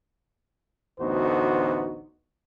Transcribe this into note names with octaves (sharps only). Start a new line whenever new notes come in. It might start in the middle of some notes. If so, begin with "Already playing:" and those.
A1 D2 B3 D#4 F#4 C5